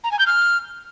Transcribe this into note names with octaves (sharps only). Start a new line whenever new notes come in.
A#5
G#5
G6
F6